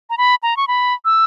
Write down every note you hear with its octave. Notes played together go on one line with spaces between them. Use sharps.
A#5
B5
A#5
C#6
B5
E6